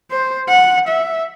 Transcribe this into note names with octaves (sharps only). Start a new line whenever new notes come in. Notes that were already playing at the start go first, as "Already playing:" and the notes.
C5
F#5
E5